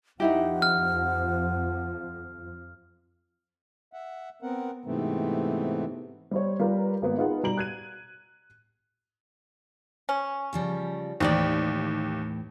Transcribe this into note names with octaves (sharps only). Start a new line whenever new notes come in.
F2 F3 D#4 E4 G4 F#5
F6
E5 F#5
B3 C4 A#4 F#5
G#2 C3 E3 A3 B3 C4
G3 C5 C#5
G3 F4 A#4 B4
G#1 A#3 B3
D#4 F4 G#4 B4 F#5
B2 G3 A#5 D7 F#7
F#6 G#6 D#7
C#4
C#3 F3 G3
D#2 A2 E3 C4 D#4 D5 G5